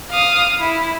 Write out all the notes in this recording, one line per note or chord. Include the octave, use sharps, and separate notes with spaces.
F5 D#6
E4